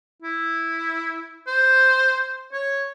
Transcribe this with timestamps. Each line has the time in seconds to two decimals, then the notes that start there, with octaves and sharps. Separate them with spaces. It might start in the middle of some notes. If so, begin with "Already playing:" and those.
0.22 E4
1.47 C5
2.52 C#5